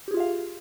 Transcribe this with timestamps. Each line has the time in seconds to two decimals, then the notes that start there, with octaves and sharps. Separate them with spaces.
0.08 G4
0.11 G#4
0.14 F4
0.17 E5
0.20 F5